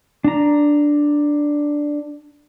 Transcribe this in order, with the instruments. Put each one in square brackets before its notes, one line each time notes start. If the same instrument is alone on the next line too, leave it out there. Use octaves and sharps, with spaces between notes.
[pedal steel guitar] D4 A#5